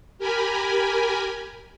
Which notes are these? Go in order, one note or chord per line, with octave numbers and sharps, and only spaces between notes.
G4 A#4 G#5 B5